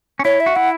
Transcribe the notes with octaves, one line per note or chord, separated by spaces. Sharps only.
C#4
E4 C#5
E5
F#4
E4 F#5